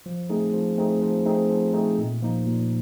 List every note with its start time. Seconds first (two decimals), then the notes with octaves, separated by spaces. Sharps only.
0.06 F3
0.29 A3 C4 D#4 G#4
0.54 F3
0.78 A3 C4 D#4 G#4
1.01 F3
1.26 A3 C4 D#4 G#4
1.49 F3
1.74 A3 C4 D#4 G#4
1.98 A#2
2.22 F3 A#3 D#4
2.47 A#2